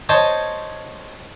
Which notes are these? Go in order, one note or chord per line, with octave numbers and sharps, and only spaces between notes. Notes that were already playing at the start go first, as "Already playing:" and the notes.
C5 C#5 D#5 A5